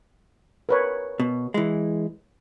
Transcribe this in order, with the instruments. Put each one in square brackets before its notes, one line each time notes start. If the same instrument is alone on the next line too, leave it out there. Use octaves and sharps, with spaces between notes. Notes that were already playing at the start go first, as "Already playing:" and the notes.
[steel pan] A#4 B4 C#5
[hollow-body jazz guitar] B2
E3 G#3